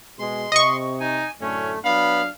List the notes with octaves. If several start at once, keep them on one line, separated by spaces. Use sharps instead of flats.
B2 G#3 C6
C3 D#5 C#6
D#4 G#5
F#2 A2 D3 A3 C#4
F#3 B3 D4 F5 B5